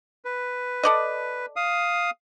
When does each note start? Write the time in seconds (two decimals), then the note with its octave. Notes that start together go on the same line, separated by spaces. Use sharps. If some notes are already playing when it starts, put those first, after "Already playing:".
0.25 B4
0.83 A4 D5 D#5
1.56 F5 D#6